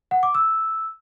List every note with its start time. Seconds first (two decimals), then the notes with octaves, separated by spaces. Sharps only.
0.11 F#5
0.23 D6
0.35 E6